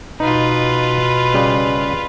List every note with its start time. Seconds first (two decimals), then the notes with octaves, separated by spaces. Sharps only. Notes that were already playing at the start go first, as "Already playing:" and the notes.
0.20 B2 D#4 F4 B4
1.34 C#3 G3